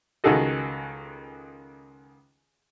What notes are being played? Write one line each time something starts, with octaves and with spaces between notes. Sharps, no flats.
C#2 D#3 F#4 G#4 A4 D#5